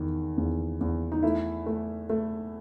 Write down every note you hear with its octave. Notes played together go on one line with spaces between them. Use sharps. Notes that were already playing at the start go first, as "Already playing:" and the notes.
Already playing: E2 D#3
E2
E2
D#4
A3 E4
A3
A3